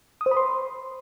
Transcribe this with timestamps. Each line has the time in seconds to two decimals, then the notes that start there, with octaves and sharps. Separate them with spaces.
0.21 D#6
0.26 C5
0.31 B5
0.37 C6